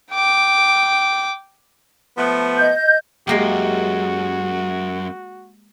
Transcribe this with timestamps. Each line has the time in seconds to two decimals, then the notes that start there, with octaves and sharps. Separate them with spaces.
0.12 G5 D6
2.18 F3 A3 B3
2.59 D#5 G6
3.27 F#2 G#3 A#3 F#4 G4